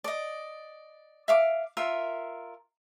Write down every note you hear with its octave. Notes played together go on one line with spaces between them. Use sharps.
D5 D#5
E5 F5 D6
F4 A#4 E5